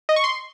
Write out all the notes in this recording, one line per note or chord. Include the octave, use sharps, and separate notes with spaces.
D#5
C#6
C6